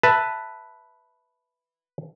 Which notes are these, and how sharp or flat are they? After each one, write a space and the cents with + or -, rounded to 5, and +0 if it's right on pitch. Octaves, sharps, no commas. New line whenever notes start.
B4 +0 E5 +0 A5 +5